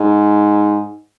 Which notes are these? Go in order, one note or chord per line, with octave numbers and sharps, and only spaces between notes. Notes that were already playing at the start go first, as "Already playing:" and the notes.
Already playing: G#2